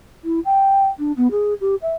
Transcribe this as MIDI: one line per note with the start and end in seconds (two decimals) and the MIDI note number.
0.24 0.40 64
0.45 0.87 79
0.99 1.12 62
1.17 1.27 59
1.31 1.54 68
1.61 1.75 67
1.82 1.95 76